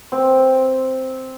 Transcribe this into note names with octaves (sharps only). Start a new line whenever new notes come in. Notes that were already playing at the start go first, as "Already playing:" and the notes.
C4